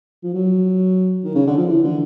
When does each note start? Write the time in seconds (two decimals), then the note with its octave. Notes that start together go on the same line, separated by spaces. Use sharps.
0.23 F3
0.34 F#3
1.24 D#3
1.35 C#3
1.46 D3
1.58 F3
1.69 E3
1.84 D3